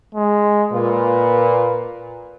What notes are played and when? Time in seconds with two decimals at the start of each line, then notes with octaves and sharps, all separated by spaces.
0.14 G#3
0.72 A#2 B4